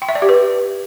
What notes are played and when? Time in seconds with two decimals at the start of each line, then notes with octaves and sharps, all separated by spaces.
0.02 G5
0.09 E5
0.15 D5
0.22 G4
0.29 B4